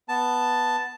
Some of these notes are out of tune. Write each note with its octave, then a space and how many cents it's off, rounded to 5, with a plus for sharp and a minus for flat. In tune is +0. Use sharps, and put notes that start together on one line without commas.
B3 +0 A5 +0